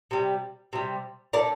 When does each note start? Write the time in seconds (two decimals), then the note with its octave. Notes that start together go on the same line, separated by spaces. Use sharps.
0.11 C3 G3
0.73 C3 G3
1.33 D3 A3 A#4 D5